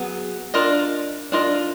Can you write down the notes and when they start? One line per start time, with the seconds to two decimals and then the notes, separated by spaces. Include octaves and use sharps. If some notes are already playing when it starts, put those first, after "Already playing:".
Already playing: F#3 B3 G#4
0.54 D4 F4 A#4 D#5
1.32 D4 F4 A#4 D#5